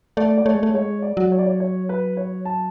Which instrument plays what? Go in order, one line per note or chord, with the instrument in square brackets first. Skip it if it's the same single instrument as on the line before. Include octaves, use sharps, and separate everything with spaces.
[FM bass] A3 [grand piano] D5
[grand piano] D5
[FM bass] A3 [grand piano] C#5
[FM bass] G#3
A3
[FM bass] G#3 [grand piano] C#5
[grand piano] D5
[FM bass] F#3
[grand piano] C#5
D5
C#5
C#5
B4
C#5
A5